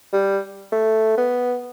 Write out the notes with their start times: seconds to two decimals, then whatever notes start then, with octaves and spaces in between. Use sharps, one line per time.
0.13 G3
0.72 A3
1.17 B3